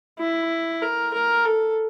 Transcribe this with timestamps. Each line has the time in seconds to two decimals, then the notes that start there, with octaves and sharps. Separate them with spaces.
0.19 E4
0.82 A#4
1.14 A#4
1.45 A4